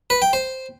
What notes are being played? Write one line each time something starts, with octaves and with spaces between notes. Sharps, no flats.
B4
G5
C5